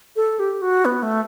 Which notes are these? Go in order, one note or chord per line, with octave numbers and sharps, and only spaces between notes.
A4
G4
F#4
B3
A3